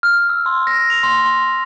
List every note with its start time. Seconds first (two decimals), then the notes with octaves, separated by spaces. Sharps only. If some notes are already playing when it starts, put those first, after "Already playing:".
0.03 F6
0.29 E6
0.46 C6
0.67 A#6
0.90 F7
1.03 C6
1.26 C6